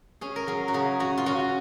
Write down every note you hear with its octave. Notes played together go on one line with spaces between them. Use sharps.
C#4 G#4
A#4
F#3 G#4
F#4
C#3 G#4
C#4 F#4
F4
C#4 F#4